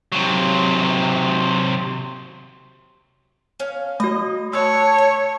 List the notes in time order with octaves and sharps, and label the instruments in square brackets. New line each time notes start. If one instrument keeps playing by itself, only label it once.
[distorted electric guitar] C3 F#3
[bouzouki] C#4 F5
[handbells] A3 F#4 [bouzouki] D#5
[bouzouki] D4 F#4 [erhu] C#5 [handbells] E6
[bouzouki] E5